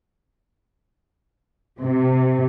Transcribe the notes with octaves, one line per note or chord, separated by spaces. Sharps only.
C3